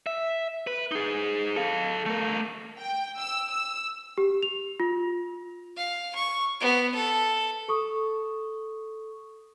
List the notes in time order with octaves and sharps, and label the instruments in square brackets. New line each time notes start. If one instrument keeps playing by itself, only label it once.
[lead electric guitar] E5
B4
D#4 G#4
A4 F5
A3 A#4
[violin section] G5
E6
E6
[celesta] G4
F7
F4
[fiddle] F5
C#6
B3
A4
[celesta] A4 C#6 D#6